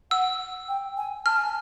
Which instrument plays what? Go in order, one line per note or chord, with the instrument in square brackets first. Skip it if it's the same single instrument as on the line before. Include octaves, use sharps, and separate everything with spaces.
[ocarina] F#5 [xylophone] E6
[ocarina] G5
G#5
[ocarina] A5 [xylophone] F6
[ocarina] G#5